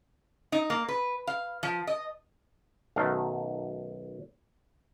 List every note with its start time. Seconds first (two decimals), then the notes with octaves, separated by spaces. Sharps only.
0.52 D#4
0.70 A#3
0.88 B4
1.27 F5
1.63 F3
1.87 D#5
2.96 B1 F#2 D#3 A3 F5